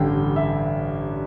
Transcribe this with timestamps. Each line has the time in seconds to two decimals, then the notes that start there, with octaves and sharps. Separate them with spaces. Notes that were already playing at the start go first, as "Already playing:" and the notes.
Already playing: A1 G2 D3 G5
0.36 E5